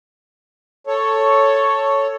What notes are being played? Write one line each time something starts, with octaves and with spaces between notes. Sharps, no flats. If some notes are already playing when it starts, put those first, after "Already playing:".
A4 C#5